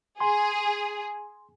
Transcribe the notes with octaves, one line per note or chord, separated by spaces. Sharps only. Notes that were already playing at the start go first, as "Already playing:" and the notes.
G#4 G#5 C6